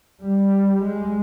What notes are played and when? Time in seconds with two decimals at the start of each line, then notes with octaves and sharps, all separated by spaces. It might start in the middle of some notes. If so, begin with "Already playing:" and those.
0.22 G3
0.83 G#3